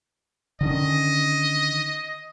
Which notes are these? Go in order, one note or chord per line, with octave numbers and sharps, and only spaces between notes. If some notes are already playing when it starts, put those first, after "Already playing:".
D3 D#3 C#4 D#5